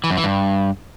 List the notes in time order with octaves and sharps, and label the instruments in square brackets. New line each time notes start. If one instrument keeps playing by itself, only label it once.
[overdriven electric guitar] E3
F#2
E3
G2